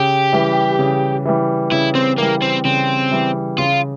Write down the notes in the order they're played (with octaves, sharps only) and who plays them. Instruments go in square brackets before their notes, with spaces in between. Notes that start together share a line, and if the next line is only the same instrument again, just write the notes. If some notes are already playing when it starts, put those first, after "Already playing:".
Already playing: [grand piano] C#3 [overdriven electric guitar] G4
[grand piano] E3 G3
C#3
E3 G3
[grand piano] C#3 [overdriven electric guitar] E4
[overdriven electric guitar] C4
[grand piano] E3 G3 [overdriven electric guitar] A#3
[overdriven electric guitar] C4
[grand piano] C#3 [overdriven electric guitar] C4
[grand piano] E3 G3
[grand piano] C#3 [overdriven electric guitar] F4